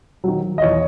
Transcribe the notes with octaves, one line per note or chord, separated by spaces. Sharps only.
D#3 F#3
D#5
E2 C#5